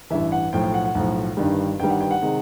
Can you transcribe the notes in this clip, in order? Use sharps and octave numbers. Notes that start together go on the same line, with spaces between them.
A1 G2 E3 E5
F#5
B1 A2 F3 G5
G5
F#5
F#5
B1 A2 F3
G1 G2 D#3 G3
G1 G2 D#3 G3 G5
F#5
G5
F#5
C3 D#3 G#3